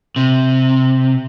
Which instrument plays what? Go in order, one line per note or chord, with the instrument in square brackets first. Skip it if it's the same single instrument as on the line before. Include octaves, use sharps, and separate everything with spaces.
[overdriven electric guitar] C3